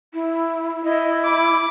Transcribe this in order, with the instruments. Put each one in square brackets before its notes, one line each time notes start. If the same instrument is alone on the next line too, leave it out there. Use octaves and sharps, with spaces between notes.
[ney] E4
[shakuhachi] E4 [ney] D#5
[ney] B5 [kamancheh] D6